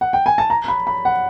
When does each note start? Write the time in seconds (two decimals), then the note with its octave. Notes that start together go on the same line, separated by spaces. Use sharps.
0.01 F#5
0.13 G5
0.26 G#5
0.38 A5
0.50 A#5
0.68 B5
0.87 B5
1.05 F#5